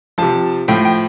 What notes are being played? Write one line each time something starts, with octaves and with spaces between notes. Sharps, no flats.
C3 F3 A5
A2 F3 G5
G5